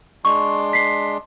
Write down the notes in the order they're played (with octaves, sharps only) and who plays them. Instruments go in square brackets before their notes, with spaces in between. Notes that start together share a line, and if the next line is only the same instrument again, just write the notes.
[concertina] G#3 D4 C6 [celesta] C#6
[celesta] B6 C7